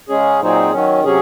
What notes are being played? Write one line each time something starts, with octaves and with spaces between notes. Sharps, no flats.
C#3 G#3 C#4 G#4
A#2 F#3 C4 D#4 G#4
D#3 F#3 C#4
C3 F#3 C#4 G#4